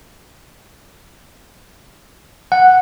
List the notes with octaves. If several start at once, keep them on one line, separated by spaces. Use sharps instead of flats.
F#5